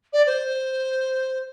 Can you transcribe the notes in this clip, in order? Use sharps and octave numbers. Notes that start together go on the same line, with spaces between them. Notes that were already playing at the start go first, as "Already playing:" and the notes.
D5
C5